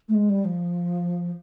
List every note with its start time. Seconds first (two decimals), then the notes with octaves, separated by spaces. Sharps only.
0.09 A3
0.14 G#3
0.30 G3
0.45 F3